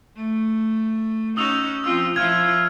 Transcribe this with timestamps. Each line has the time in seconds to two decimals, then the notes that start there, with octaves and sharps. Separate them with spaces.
0.16 A3
1.37 C#4 D#4 F#4 D#6 E6 F7
1.84 F3 C4 F4 E6
2.16 F3 E4 F4 F6 G#6